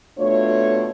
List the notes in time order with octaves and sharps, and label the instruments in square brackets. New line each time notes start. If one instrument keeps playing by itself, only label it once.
[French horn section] B2 A3 D4 F4 C#5